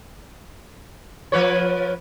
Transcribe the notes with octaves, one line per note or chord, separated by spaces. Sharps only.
F3 B4 C#5